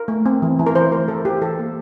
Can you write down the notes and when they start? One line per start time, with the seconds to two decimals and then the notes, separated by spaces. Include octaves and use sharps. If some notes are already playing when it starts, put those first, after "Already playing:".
Already playing: A#4
0.08 A3
0.26 C4
0.42 E3
0.59 E3
0.67 A#4
0.75 E3 C5
0.91 A3 A#4
1.08 E3 A4
1.25 E3 G4
1.42 E3 A4
1.59 A#3